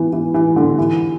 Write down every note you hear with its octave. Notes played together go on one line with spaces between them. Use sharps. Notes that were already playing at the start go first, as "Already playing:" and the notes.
Already playing: E3 B3
E3
E3
D3
E3